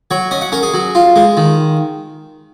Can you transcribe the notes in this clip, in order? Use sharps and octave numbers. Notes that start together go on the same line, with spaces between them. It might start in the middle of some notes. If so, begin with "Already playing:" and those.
F#3 C#5
C#4 D#5
F#5
C#4 A#4
G#4
F#3
F4
G#3
D#3